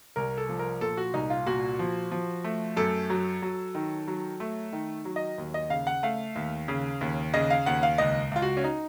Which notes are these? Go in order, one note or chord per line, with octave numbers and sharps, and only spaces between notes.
C2 A#4
A4
F3
A#4
A#2 A4
F#4
C2 D#4
F4
A#2 F#4
F3
F3
A3
F#2 A4
F#3
F#3
D#3
F#3
A3
D#3
F#3
D#5
D#2
D#5
C#3 F5
F#5
A3 F5
D#2
C#3
D#2
C#3 D#5
F5
D#2 F#5
F5
C#2 D#5
C#2 F4
F#4
C#4
D#4